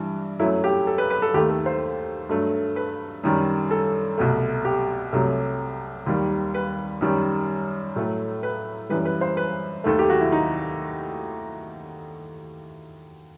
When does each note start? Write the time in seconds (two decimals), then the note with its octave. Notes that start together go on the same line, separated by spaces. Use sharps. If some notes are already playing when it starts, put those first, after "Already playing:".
Already playing: G2 E3 G3
0.39 F#2 F#3 A3 E4
0.64 G4
0.87 A4
0.98 B4
1.10 B4
1.22 A4
1.34 D#2 D#3 A3 G4
1.50 A4
1.66 C5
2.29 G2 F#3 A3
2.76 B4
3.24 F#2 D#3 G3
3.71 A4
4.18 C2 B2 A3
4.65 G4
5.13 C2 C3 F#3 A3
6.06 D#2 D#3 G3
6.54 B4
7.01 F#2 D#3 G3
7.96 A2 F#3 A3
8.43 B4
8.90 F#2 E3 G3 B4
9.05 B4
9.21 C5
9.37 B4
9.84 D#2 D#3 A3 A4
9.99 G4
10.10 F#4
10.21 E4
10.32 D#4